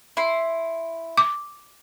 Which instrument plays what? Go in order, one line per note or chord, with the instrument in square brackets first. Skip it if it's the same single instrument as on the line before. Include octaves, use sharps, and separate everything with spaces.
[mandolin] E4 C6
[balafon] D6